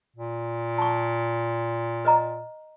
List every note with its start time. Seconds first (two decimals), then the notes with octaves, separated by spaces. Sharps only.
0.16 A#2
0.78 A5 C#6
2.05 B4 D#5 A#5